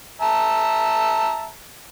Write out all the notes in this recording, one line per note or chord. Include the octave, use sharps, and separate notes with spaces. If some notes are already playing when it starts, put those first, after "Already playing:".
E5 A5 A#5